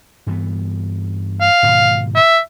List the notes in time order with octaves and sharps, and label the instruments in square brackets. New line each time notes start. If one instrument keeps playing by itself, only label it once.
[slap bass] G2 E3 B3
[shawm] F5
[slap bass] G#2 B2 D#3
[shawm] E5